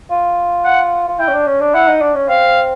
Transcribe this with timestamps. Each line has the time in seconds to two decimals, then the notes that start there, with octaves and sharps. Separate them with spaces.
0.10 F4
0.65 F#5
1.08 F4
1.19 E4 G5
1.28 C#4
1.33 D4
1.47 C#4
1.61 D4
1.74 E4 F#5
1.88 D#4
2.01 D4
2.15 C#4
2.29 C4 F5